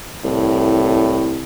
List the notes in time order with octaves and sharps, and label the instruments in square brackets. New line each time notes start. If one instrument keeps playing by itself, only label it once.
[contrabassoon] C2 [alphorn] A2